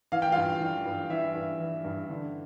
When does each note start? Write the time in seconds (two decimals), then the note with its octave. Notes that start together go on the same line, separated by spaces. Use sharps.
0.12 E3 F5
0.22 G5
0.32 G2 F4 F5
0.61 E3
0.86 G2
1.10 E3 E5
1.35 G2
1.60 E3
1.85 G2
2.09 D3